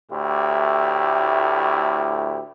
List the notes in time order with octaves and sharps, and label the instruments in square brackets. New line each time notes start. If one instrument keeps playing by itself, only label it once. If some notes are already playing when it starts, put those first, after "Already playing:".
[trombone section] D2 A2 E4 G4